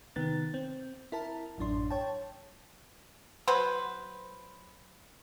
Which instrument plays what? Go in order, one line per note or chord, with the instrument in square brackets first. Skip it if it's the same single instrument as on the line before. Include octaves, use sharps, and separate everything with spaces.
[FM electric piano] C3 D#3 B3 A6
C4
E4 A#4 A5
A1 F#2 D4 C6
C#5 G5 A5
[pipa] F#3 B4 C5